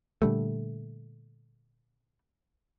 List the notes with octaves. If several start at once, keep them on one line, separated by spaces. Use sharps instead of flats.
A#2 D3 G3 A3